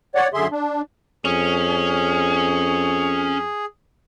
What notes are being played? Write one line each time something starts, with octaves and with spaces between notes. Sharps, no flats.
C#5 D5 F#5
F#2 D3 G#4 E5 C6
D4
F2 C#4 G#4